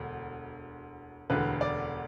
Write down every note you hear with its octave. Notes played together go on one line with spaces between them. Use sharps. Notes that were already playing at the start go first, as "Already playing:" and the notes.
Already playing: E1 D2
E1 D2 D3 B4
D5